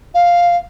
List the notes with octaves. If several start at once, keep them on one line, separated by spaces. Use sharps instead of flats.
F5